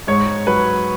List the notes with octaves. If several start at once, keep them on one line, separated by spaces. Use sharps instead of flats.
G#2 C#5
F#3 B4